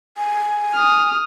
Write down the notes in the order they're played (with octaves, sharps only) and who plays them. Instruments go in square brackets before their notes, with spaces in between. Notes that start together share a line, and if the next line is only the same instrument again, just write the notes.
[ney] G#5
[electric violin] D#6 F6